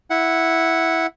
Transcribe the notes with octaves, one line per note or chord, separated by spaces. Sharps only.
E4 F#5